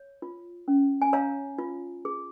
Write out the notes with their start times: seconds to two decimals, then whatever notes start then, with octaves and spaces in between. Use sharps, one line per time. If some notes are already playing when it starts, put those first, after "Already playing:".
Already playing: C#5
0.22 F4
0.68 C#4
1.02 G#5
1.13 C#5 F5 A#5
1.58 F4
2.05 G#4